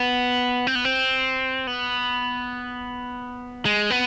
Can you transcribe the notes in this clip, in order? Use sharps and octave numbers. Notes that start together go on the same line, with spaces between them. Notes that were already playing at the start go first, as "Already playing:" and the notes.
Already playing: B3
C4
B3
C4
B3
G#3
B3